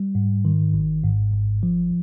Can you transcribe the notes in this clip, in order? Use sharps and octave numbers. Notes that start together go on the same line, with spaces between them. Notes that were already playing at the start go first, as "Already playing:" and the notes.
Already playing: G3
G#2
D#3
G#1
G#2
G#1
F3